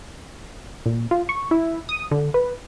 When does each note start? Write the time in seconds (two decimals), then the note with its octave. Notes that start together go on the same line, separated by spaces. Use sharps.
0.86 A#2
1.11 F4
1.29 C#6
1.51 E4
1.89 D#6
2.11 D3
2.34 B4